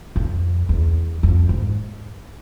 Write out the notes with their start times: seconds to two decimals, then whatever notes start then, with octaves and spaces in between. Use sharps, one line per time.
0.16 F2
0.69 E2
1.23 F2
1.49 G#2